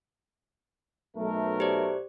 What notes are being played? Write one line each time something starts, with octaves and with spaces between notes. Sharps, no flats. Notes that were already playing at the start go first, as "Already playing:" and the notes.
B1 A3 A#4
G4 C5 D5